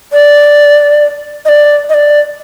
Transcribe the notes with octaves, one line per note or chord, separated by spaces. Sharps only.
D5
D#5
D5
D#5
D5